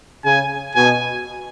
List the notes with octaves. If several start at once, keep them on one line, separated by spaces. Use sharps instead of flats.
C#3 G#5
B2 G#5